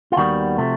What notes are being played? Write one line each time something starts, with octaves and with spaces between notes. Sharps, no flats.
F4
D#2 D#3 G3 B3 F#4
C3 F3 A3